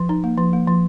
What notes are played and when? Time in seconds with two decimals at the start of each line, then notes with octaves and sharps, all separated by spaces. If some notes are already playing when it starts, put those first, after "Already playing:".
Already playing: F3
0.09 D#4
0.24 A#3
0.38 F3
0.53 A#3
0.68 F3